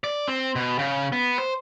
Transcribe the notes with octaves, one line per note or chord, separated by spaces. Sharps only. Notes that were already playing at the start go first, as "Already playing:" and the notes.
D5
C4
B2
C#3
B3
C5